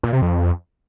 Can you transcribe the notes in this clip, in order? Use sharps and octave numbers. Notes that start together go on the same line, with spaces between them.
A#2
C3
F2